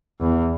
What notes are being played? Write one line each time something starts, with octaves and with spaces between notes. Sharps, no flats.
E2